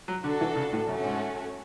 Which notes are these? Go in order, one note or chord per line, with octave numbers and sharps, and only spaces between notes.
F#3
D3 D4 F#4 A4
E3
C#3
A2
F#2 A3 C#4 F#4
G#2